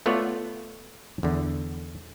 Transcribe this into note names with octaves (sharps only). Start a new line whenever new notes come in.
A3 B3 F4 C#5 D5 F#5
E2 D3